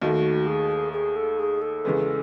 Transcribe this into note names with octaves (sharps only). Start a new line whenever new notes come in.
D#2 D#3 A3 F#4
G#4
G#4
A4
G#4
A4
E2 C#3 E3 G#3 B3